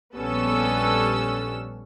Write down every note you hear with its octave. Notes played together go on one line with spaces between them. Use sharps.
A#1 G3 B3 C#4 A4 E6